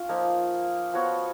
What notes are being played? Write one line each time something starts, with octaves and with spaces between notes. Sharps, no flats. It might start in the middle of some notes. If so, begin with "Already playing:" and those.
Already playing: C#4 F4
F3 A#3 D#4 A#4
F3 B3 F#4 C#5